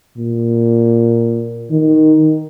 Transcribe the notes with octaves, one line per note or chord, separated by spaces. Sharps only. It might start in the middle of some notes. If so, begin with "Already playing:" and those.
A#2
D#3